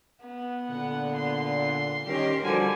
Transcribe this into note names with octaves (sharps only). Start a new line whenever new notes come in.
B3
A#2 D3 F#5
C6
D#3 G3 C#4 G4 A#4
D3 F3 G3 F#4 G#5